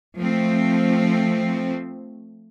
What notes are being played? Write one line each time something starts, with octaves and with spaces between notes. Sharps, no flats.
F3 A3 C4